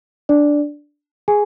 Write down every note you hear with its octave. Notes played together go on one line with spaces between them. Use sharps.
D4 D5
G#4 G#5